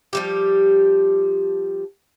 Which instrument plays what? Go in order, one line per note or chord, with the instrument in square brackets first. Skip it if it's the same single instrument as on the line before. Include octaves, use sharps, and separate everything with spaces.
[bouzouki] F3 G3 G4